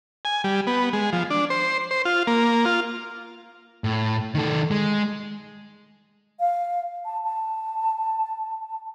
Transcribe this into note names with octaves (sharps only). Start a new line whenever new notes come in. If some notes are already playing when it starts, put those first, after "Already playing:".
G#5
G3
B3
G#3
F3
D4
C5
C5
F4
A#3
F4
A2
D#3 A4
G#3
F5
A5
A5